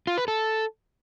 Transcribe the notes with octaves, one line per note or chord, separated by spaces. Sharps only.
F4
B4
A4